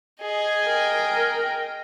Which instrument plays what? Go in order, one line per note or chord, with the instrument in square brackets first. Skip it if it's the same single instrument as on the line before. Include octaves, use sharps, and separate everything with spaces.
[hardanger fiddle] G#4 D#5
[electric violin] A#4 G5